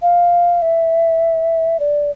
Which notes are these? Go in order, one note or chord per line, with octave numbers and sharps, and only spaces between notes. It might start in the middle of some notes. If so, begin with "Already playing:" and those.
F5
E5
D5